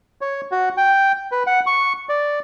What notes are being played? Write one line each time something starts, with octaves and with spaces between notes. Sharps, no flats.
C#5
F#4
G5
B4
F#5
C#6
D5